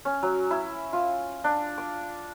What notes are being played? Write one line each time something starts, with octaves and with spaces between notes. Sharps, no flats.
C#4
F#3
E4
F4
D4
D6